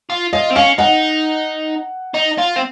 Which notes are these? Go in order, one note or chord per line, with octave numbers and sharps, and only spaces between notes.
F4
F4 D#5
C4
C#4 F5
D#4 F#5
D#4
F4
C4